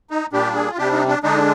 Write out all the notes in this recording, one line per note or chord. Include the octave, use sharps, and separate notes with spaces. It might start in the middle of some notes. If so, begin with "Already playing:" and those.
D#4
A#2 G3 D4 G4
G#4
F4
C3 G3 D4 G4
D#4
D4
D3 G#3 D4 D#4